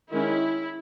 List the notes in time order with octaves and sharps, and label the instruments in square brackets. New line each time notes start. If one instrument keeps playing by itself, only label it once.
[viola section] D#3 G#3 C#4 E4